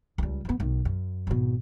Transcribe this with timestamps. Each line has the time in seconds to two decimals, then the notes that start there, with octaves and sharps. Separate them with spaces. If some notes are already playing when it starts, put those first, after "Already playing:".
0.18 C#2 G3
0.45 F3 B3
0.60 B1 D#3
0.85 F#2
1.27 G#1 B2